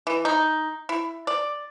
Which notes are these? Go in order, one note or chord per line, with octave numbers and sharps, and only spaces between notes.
E3
D#4
E4
D5